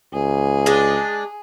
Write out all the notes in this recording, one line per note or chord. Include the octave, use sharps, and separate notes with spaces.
C#2 G#4
G#3 D4